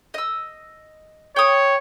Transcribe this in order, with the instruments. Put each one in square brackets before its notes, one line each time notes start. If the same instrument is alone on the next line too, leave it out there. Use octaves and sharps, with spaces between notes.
[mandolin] D#5 E6
[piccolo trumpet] C#5 [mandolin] G5 D#6